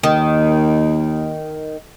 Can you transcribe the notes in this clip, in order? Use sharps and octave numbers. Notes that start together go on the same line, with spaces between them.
D#2 D#3